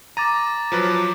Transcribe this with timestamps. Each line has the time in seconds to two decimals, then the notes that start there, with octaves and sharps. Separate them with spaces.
0.17 A#5 D6 A6 D#7
0.72 F3 F#3 B4